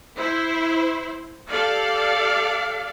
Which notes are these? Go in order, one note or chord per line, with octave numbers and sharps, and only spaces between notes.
E4 C5
G4 A4 D5 F5